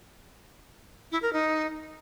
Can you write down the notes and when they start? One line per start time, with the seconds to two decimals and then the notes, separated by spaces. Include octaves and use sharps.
1.12 E4
1.22 A#4
1.33 D#4